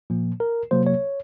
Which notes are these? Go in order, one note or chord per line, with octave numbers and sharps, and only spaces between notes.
A#2 F3 A#3
A#4
C3 F#3 A#3 C5
C#5